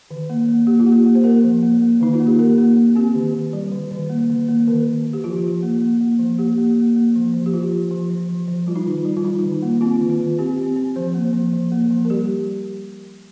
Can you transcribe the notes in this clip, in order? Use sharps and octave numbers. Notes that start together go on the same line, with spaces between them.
D#3
A#3
A#3
A#3 G4
F4
A#3
G4
A#3
C5
A#3 A#4
F3
A#3
A#3
D#3 D#4
F4
A#3
G4
A#3 A#4
A#3
A#3
C4 G4
D#3
D#3
G3
D#3
D#3
A#3
D#3
A#3
D#3 A#4
D#3
D#3
G4
F3 F4
F3
A#3
A#3
A#3
F3
A#3 G4
A#3
A#3
A#3
F3
F3
G4
F3 F4
F3
F3
F3
F3
F3
G3 F4
D#4
D#3 F4
G3
F4
G3 D#4
D#3
A#3
C4 F4
D#3
F4
D#3
C4 G4
C4
C4
F3 C5
A#3
F3
F3
A#3
F3
A#4
G3 G4